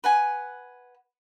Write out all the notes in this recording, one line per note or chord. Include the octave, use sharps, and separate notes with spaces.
B4 F#5 G#5